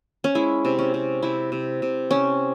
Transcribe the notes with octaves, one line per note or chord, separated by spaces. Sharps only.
C#4
G#3 E4
C3
C#4
C3
C3 E4
C3
C3
C3 C#4